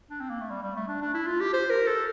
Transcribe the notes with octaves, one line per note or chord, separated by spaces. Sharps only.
D4
C4
A#3
A3
G3
G3
A3
D4
D4
E4
F4
G4
C5
A#4
A4